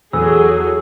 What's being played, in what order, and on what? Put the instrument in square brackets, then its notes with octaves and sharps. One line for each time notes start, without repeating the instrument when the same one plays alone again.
[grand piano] E2 [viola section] F#3 G#4 [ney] A4 [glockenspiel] E6